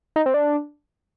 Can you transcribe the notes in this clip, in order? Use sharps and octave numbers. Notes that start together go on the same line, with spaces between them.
D#4
C4
D4